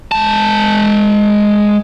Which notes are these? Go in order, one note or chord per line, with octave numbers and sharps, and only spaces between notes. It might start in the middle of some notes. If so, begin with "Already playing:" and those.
G#3 A5